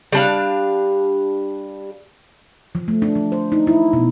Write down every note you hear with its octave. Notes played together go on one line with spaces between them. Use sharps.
G3 D4 F5
F3
A3
D4
F3
C5
D#4
E4
B2